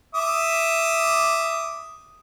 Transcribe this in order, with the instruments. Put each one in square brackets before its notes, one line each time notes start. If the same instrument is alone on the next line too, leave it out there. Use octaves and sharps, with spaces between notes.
[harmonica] E5 D6 D#6